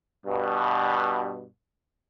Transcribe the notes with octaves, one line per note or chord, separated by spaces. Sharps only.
G2 B2